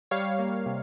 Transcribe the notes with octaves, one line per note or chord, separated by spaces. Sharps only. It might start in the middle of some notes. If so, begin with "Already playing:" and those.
G3 C#5 F5
A#3
C3